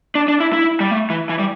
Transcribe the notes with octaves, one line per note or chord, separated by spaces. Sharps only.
D4
D4
E4
E4
G3
A3
E3
E3
G3